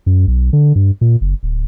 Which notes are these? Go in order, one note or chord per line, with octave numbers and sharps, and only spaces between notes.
F#2
B1
D3
G2
A#2
F#1
D1